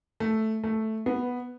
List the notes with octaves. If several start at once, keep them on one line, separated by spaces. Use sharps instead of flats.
A3
A3
B3